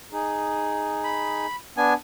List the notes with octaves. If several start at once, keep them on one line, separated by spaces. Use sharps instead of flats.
D#4 G#4
B5
B3 D4 G#5